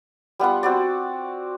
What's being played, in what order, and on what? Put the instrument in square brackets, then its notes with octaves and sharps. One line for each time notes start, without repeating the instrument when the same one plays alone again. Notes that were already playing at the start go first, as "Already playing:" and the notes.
[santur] G3 B3 F4 F#5
C4 F#4 D5